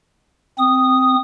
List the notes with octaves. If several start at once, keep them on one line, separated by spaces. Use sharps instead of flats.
C4 D#6